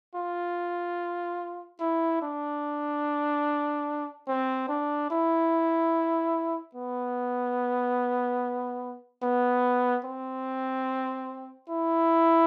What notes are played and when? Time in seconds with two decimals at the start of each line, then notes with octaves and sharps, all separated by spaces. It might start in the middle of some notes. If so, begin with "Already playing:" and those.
0.16 F4
1.80 E4
2.22 D4
4.28 C4
4.69 D4
5.11 E4
6.75 B3
9.23 B3
10.05 C4
11.70 E4